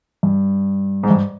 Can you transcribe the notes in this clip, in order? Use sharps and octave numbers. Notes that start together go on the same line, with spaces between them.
G2
G#2
G2